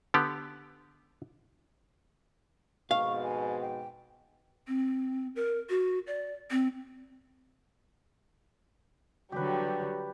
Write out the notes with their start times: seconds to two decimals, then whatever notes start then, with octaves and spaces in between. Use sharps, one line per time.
0.14 D3 B3 G4
2.91 F2 G#2 B2 F5 C#6
3.24 G#5
3.62 G5
4.68 C4
5.36 A#4
5.70 F#4
6.07 D5
6.51 C4
9.32 D3 F#3 G3 G4 B4